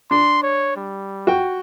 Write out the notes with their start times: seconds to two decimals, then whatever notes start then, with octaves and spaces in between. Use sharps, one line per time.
0.11 D4 C6
0.43 C#5
0.77 G3
1.27 F#4 G5